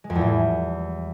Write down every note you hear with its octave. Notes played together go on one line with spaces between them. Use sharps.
G#3
F2
E2
A2
G3